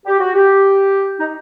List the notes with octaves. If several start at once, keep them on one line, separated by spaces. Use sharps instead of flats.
G4
F#4
G4
D#4